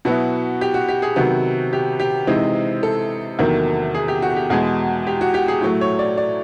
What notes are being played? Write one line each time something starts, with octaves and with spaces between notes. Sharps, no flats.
B2 F#3 B3 E4 F#4
G4
F#4
G4
G#4
C3 D#3 F#3 B3 F#4
G4
G4
C3 E3 G#3 C4 D#4
A4
E2 C3 D#3 F#3 A#3
G#4
G4
F#4
G4
E2 B2 G#3 G#4
G4
F#4
G4
G#4
A2 F#3 A3
C#5
D5
D5